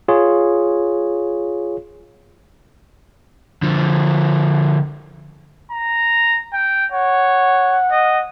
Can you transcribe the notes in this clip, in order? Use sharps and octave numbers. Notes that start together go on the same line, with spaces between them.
F4 G#4 C#5
D3 F3
A#5
G5
C#5 F#5
D#5